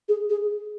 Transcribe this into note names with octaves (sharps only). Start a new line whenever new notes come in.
G#4
G#4